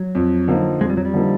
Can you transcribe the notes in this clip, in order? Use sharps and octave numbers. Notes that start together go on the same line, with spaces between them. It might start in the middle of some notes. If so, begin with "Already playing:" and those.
Already playing: F#3
F2
D3 F3 A#3 D#4
F2 G#3
G3
F#3
G3
D3 F3 A#3 D#4